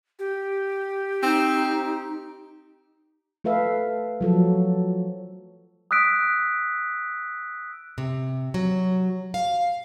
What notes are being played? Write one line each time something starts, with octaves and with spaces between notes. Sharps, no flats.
G4
C4 D#4
A3 A4 B4 E5 F5
F3 F#3 A4
D#6 E6 F#6 B6 D7
C3
F#3
F5